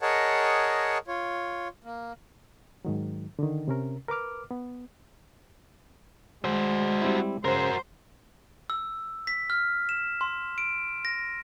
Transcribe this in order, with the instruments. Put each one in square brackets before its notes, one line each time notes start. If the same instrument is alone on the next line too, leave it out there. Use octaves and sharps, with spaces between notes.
[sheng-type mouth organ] G#4 A#4 C#5 D#5 F#5 A5
F4 C#5
A#3
[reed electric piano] G#2 D#3 F#3
D3 D#3
C3 C#4 A#4
A#4 B4 D6 F6
B3
[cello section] G#3 [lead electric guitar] F#4 C5
[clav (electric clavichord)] G3 C4 E4
[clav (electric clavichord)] C#3 [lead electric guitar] F#4 A#4 [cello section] C5
[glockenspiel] E6
B6
F6
E7
C6
D7
A#6